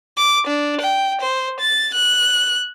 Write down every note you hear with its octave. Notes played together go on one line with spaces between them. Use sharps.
D6
D4
G5
C5
A6
F#6